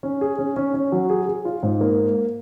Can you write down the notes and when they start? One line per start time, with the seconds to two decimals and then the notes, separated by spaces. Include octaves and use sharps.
0.03 C#4
0.21 G#4
0.38 C#4
0.56 C#4
0.74 C#4
0.92 F#3
1.10 G#4
1.28 G#4
1.45 F4
1.63 G#2
1.81 A#3